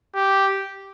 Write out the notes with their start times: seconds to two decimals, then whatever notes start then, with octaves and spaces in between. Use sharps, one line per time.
0.15 G4